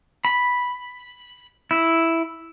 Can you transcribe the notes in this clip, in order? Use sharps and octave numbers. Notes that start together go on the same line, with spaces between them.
B5
E4